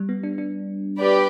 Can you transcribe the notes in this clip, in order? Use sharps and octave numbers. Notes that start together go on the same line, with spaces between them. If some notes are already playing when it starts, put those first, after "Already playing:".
Already playing: G3
B3
D4
D4
G4 B4 D5